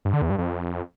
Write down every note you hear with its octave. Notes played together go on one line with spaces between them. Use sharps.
G2
D3
E2
G2
F2